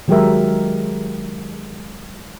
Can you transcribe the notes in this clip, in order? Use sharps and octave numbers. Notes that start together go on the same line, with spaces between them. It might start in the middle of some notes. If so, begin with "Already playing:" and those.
D#3 F#3 G#3 G4 A#4 E5